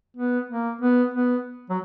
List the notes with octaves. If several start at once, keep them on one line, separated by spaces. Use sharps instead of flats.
B3
A#3
B3
B3
F#3